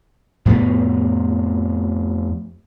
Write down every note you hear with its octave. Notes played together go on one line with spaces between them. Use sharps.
F2 A2 F3 B3